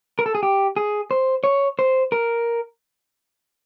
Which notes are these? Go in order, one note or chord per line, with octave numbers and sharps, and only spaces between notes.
A#4
A4
G#4
G4
G#4
C5
C#5
C5
A#4